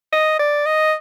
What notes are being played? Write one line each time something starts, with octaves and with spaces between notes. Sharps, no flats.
D#5
D5
D#5